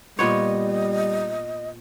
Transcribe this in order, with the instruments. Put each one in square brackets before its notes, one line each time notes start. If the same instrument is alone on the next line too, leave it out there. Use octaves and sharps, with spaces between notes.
[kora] A#2 B3 C#5 [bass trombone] G3 [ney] D#5